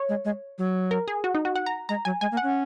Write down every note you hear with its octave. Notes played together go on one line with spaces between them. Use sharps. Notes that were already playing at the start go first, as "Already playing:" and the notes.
Already playing: C#5
G#3
G#3
F#3
A#4
G#4
F#4
D#4
F#4
F#5
A#5
G#3 A#5
F#3 G#5
G#3 G#5
A#3
F#5
C#4